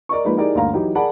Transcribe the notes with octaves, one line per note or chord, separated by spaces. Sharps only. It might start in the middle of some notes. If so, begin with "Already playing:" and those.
A#4 D5 D#5 C#6
F3 G#3 A#3 D#4 B4
D#4 E4 G4 G#4 A#4 D5
D2 G2 A#3 F5 A#5
E3 F#3 D#4 E4 G4
G#4 A#4 D5 F#5 A5 B5